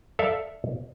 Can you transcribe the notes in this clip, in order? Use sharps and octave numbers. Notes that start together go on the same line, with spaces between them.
A4 D5 E5 F5